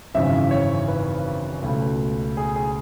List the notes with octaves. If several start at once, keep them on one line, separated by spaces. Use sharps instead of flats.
G#1 F#2 C#3 E3 E5
C#5
B4
C#2 B2 A3
G#4
G#4